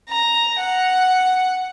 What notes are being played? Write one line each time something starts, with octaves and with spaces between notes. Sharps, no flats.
A#5
F#5